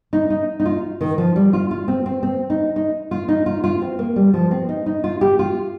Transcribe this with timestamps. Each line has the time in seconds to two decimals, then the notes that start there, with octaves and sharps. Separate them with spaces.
0.13 D#4
0.30 D#4
0.60 D#4
0.65 F4
1.01 D#3
1.18 F3
1.36 G3
1.53 F4
1.71 F4
1.88 C4
2.06 C4
2.23 C4
2.50 D#4
2.76 D#4
3.11 F4
3.28 D#4
3.46 F4
3.64 F4
3.82 C4
3.99 A#3
4.16 G3
4.34 F3
4.51 C4
4.69 D#4
4.86 D#4
5.04 F4
5.21 G4
5.39 F4